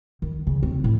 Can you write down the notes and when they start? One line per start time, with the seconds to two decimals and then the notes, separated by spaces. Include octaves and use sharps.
0.22 D#3
0.47 C#3
0.63 C4
0.84 A2